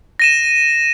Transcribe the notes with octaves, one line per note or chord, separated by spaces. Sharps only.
A#6 D#7 E7